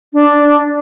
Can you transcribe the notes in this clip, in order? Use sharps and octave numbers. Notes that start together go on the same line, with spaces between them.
D4